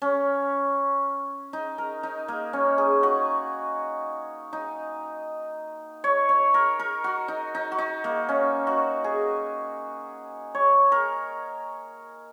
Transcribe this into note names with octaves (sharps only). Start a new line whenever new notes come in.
C#4
D#4
A#4
D#4
A#3
C#4
G#4
F#4
D#4
C#5
C#5
A#4
A#4
F#4
D#4
D#4
F#4
D#4
A#3
C#4
F#4
G#4
C#5
A#4